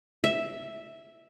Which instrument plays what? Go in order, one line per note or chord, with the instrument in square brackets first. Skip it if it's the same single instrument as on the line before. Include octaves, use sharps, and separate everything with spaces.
[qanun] E5